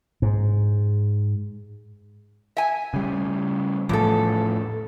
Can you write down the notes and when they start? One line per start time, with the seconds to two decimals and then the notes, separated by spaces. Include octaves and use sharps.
0.22 G#2
2.57 E5 G#5
2.94 C#3 G3
3.89 E2 A2 F3 A4